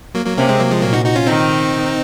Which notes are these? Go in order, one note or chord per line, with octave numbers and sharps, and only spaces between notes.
F#3 A#3
F#3 A#3
C3 A#3 C#4
G#3 C4
F#3 A#3
F3 G#3
A#2 F#3 A#3
D#4 F#4
D#4 F#4
C#4 F4
D#3 C4 D#4